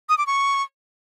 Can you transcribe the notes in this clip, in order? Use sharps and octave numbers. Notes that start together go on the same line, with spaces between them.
D#6
D6
C#6